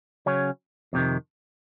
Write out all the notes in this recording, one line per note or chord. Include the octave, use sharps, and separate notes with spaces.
C#3 F#3 C#4
F2 C3 D#3